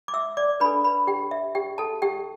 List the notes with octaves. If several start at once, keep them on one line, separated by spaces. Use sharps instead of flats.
D6
E5 E6
D5 D6
D4 A4 B4 B5
B4 B5
G4 G5
E5
G4 G5
A4 A5
G4 G5